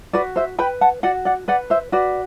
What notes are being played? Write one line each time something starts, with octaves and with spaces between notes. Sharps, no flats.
F#4 B4 D5
C5 E5
B4 G5 B5
F#5 A5
F#4 D5 F#5
D5 F#5
B4 D5 F#5
C5 E5
F#4 B4 D5